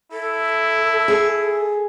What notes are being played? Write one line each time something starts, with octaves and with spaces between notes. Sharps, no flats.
E4 A4
G#4